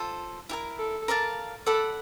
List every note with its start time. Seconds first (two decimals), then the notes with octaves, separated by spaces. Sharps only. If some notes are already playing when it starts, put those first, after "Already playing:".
Already playing: F4 A4 C5
0.49 E4 G4 A#4
0.78 A4
1.08 A#4 D5 F5 A5
1.66 A4 D5 F#5 B5